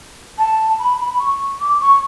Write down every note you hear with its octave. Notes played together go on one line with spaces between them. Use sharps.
A5
B5
B5
B5
C#6
D6
C#6